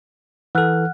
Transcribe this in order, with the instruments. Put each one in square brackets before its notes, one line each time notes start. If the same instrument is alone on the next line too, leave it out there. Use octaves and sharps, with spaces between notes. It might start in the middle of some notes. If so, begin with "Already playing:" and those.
[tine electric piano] E3 A4 [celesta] F#5 F6 F#6